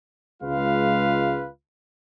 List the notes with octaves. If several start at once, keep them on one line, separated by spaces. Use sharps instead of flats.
C#2 G#3 F4 B4 F5